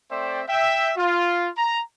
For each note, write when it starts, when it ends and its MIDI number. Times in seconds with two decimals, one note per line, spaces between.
0.11 0.42 57
0.11 0.42 60
0.11 0.42 72
0.11 0.42 74
0.11 0.42 76
0.11 0.42 79
0.48 0.91 76
0.48 0.91 79
0.97 1.49 65
1.58 1.80 82